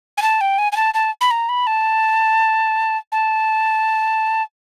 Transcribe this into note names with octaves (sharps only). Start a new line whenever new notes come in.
G#5
A5
G5
G#5
G#5
A5
A5
B5
A#5
B5
A5
A5